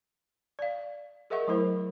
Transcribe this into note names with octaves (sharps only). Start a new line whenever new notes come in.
D5 F5
G#4 A#4 D#5 E5 F#5 C#6
F#3 A3 E4 A#4 C5